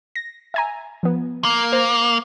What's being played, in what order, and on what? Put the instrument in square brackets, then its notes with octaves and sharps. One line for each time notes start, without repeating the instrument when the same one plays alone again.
[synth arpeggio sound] A#6
E5 G#5 A#5
F3 B3
[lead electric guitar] A#3
[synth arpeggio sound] C5 A#6